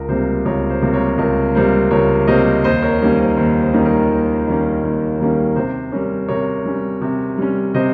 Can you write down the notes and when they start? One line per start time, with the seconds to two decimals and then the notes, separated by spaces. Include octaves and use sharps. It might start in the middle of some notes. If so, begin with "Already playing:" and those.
Already playing: C#2 A#4
0.09 C3 G3 A#3 C5
0.45 C#2 A#4 C#5
0.70 C5
0.82 C3 G3 A#3
0.94 A#4 C#5
1.18 C#2 A#4
1.55 C3 G3 A#3 C5
1.91 C#2 A#4 C#5
2.27 C3 G3 A#3 C5 D#5
2.64 D#2 C5 D#5
2.82 A#4 C#5
3.01 D#3 G3 A#3 C#4
3.19 C5
3.37 D#2 C5
3.62 C5
3.74 D#3 G3 A#3 C#4
3.86 A#4
4.10 D#2
4.47 D#3 G3 A#3 C#4
4.83 D#2
5.19 D#3 G3 A#3 C#4
5.56 C3 C5
5.92 G3 C#4 A#4 C#5
6.29 C3 A#4 C#5
6.65 G3 C#4
7.01 C3
7.38 G3 C#4
7.74 C3 C5 D#5